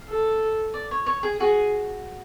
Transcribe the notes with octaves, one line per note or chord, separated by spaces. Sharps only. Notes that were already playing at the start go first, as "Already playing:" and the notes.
Already playing: F5
A4
D5
C#5
C#5
G#4
F#4 G#4